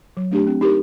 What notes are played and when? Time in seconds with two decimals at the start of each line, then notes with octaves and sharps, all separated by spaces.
0.17 F#3
0.31 A3 D4 G4
0.47 C4
0.61 D#4 G4 A#4